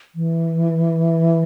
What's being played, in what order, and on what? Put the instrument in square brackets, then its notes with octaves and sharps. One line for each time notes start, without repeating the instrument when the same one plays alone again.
[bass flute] E3